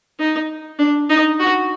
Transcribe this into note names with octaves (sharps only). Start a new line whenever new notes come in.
D#4
D4
D#4
F#4